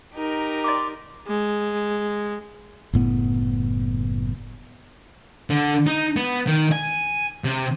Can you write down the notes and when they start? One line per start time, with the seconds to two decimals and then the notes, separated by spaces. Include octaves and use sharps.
0.14 D#4 G4 A#4
0.64 D5 C6 D6
1.27 G#3
2.93 F#1 A2 B3
5.50 D3
5.87 D#4
6.16 B3
6.47 D#3
6.72 G#5
7.44 C3